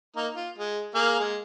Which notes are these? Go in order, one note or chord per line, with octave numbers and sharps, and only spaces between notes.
A#3 D#4
F4
G#3
A#3 G#4 F5
G#3